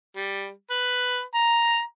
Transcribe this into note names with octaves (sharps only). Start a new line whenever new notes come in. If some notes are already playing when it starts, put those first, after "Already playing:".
G3
B4
A#5